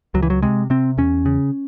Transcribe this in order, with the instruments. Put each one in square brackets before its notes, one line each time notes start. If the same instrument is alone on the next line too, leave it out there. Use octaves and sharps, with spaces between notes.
[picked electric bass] C#2 F#3
E3
F#3
C3 G#3
C3 C4
E2 C#4
C#3